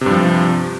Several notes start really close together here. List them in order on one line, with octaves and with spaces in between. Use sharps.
C3 G2 F3